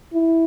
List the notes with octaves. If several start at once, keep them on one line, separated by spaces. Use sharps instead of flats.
E4